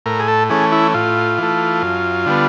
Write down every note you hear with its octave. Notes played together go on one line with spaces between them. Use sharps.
A2 A#4
G#4
A4
E3 A3 C#4 G#4
E4
A2 F4
E3 A3
F#2
D3 G3 B3